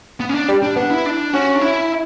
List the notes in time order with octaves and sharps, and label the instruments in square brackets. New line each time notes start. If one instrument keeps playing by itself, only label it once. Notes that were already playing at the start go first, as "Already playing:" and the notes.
[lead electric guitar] B3
C#4
D4
[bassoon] G3
[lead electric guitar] D4
[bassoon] B3 [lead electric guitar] D4
[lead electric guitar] E4
D4
[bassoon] C#4 [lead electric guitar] F#4
[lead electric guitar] D4
E4